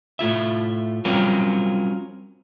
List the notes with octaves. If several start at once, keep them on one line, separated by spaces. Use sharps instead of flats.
A2 A3 F4 E5
F#3 G3 C4 C#4 F4 A#4